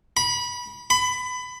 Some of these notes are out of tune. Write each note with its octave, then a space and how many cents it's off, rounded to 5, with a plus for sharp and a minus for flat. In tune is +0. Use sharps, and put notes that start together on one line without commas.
B5 -25
B5 +20